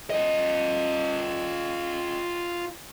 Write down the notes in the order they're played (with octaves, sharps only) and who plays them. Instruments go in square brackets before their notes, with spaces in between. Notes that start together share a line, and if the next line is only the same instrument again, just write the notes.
[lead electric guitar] F4 D#5